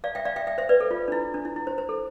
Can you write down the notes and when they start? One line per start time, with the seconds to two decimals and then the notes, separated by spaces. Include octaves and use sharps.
0.04 D5 F5
0.15 E5 G5
0.25 D5 F5
0.36 E5 G5
0.47 E5 G5
0.58 C5 E5
0.69 B4 D5
0.80 A4
0.91 F4
1.08 D4
1.12 E4
1.34 D4
1.45 E4
1.56 E4
1.67 C5
1.78 C5
1.89 A4